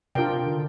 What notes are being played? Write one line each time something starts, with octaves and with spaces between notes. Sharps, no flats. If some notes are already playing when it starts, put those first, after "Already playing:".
C3 D4 F4 A#4 D5 G5
D3